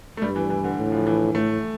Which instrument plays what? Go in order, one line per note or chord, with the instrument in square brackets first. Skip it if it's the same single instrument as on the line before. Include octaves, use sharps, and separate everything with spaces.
[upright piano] A3
[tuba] G2 [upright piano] G3
[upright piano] E3
E3
D3
[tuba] A2
[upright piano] F3
E3
[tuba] A2 [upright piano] A3